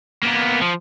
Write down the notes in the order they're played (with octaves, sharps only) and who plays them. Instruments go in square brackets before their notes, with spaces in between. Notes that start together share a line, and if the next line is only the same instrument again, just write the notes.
[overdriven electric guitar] A#3 B3
F3